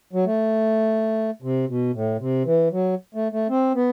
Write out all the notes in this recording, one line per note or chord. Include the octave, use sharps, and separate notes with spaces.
F#3
A3
C3
B2
A2
C3
E3
F#3
A3
A3
C4
B3